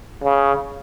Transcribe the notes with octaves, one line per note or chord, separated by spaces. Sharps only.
C#3